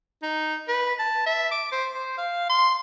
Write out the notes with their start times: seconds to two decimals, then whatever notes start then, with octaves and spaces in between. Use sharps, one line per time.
0.23 D#4
0.68 B4
0.99 A5
1.26 E5
1.51 D6
1.72 C5
1.93 C5
2.18 F5
2.50 C6